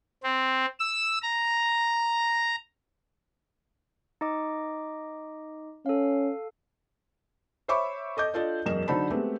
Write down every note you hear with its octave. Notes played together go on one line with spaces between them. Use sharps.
C4
E6
A#5
D#4 D#5 D6
C#4 A4 F5
C5 C#5 E5 B5 C#6 D6
A4 D#5 D6 G6
D4 F4 A4 D5 D#5
E1 F#2 A#4 D#5 E7
D3 F#3 D#4 C5 A5 B5
G#3 A3 B3 C4 G4